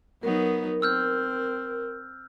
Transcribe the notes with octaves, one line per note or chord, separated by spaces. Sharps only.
F#3 B3 D#4 A#4
C4 E6 F6 G6